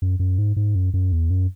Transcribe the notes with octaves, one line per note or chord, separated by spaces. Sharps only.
F#2
F#2
G#2
G#2
F#2
F#2
E2
F#2